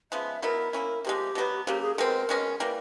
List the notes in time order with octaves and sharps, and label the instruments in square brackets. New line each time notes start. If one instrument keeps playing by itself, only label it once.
[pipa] C#3 F3 G#3 B3 [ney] E5
[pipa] B2 F#3 B3 E4 [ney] A#4
[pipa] A#3 C#4 E4
[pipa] C3 F3 G#3 [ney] G4
[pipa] B2 F#3 B3
[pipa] C#3 F#3 A#3 [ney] G4
[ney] G#4
A4
[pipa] B2 G#3 C4 [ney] A#4
[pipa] B2 G#3 C#4
E3 G3 A#3